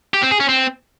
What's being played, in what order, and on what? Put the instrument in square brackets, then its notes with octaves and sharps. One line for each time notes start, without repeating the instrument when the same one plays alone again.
[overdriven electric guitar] G4
C4
G#4
C#4
C4